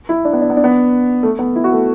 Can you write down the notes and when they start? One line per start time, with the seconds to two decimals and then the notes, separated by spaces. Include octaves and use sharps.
0.09 E4
0.25 D4
0.33 B3
0.41 D4
0.50 B3
0.57 D4
0.64 B3
1.23 A3
1.39 B3
1.56 E4
1.64 F#4
1.72 A3